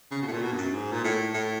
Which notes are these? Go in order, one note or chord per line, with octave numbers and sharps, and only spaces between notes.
C#3
B2
A2
A#2
B2
G2
F#2
G#2
A#2
A2
A2